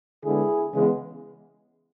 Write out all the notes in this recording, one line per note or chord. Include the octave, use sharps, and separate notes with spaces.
D3 G#3 B3 E4 G#4
C#3 E3 G#3 B3